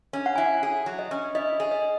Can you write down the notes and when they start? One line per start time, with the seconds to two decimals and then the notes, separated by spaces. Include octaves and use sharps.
0.13 C#4
0.26 F#5
0.36 E4 G#5
0.46 F#5
0.63 G#4
0.86 F#3
0.99 D#5
1.11 C#4
1.35 E4 D#5
1.60 G#4
1.71 D#5